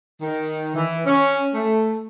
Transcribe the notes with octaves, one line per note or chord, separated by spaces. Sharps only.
D#3
E3
C#4
A3